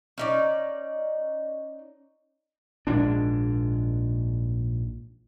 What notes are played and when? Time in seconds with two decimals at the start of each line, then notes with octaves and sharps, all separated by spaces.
0.18 C#4 D#4 D5
2.87 A#1 G#2 G#3 D4